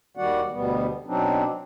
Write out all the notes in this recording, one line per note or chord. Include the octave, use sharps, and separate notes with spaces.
D#2 D#3 G3 F#4 D5 F#5
D2 B2 G3 B3
B2 F#3 C4 D4 D#4